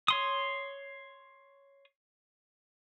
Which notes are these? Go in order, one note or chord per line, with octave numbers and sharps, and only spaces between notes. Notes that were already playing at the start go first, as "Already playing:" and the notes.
C#5 C6 D#6